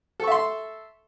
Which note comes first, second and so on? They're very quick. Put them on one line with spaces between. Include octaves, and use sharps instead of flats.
A4 C#6 E5 C6